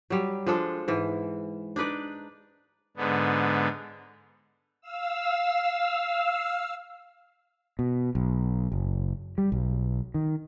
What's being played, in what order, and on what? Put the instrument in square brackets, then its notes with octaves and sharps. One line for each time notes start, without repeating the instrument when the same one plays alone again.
[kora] F#3 G3
F3 G#3 D4 A4
G#2 E3
D4 D#4 B4 D5
[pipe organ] G#2 D3 B3
[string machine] F5 E6
[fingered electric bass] B2
B1
F#1
G3
B1
D#3